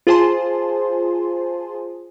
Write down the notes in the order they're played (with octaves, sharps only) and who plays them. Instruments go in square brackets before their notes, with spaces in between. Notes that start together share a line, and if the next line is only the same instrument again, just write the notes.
[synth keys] F4 G#4 C5 G#5 A5 C6